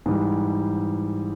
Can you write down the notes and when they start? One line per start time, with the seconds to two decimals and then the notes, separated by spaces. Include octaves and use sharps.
0.06 G#2 E3 G3